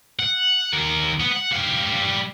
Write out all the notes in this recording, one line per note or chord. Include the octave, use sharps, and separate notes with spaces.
F#5
D#2 A#4
B3
F#5
G3 F5